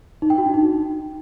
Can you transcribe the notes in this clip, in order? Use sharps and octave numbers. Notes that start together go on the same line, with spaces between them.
D#4
G5
F#4
D4
D#4